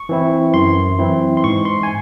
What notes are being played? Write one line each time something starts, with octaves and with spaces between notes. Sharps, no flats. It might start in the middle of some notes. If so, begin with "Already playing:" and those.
Already playing: C#6
E3 C4 E4
F#2 C6
E3 C4 E4
C6
G#2 C#6
C6
G#5